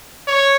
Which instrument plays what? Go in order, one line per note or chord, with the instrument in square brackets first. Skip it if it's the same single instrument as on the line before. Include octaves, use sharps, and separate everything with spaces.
[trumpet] C#5